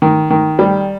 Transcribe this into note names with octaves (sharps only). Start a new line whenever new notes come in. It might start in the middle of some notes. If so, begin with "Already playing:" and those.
D#3
D#3
G3